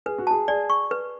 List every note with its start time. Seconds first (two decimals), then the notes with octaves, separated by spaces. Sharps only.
0.06 G#4 B4
0.18 F#4
0.27 G#4 A5
0.48 G#4 D5
0.70 C#6
0.91 B4